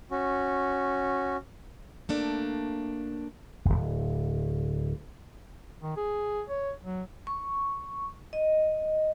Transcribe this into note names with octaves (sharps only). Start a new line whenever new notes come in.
C#4 F#4
A3 A#3 D4
D1 G1
D#3
G#4
C#5
F#3
C#6
D#5